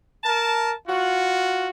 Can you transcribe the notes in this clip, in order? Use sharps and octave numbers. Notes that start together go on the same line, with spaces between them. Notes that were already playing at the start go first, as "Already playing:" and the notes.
A#4 A5
F4 F#4